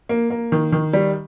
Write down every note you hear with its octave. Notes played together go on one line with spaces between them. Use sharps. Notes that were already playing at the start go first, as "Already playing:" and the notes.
A#3
A#3
D#3
D#3
G3